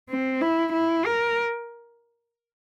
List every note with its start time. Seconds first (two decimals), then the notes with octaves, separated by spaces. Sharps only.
0.09 C4
0.41 E4
0.73 E4
1.05 A#4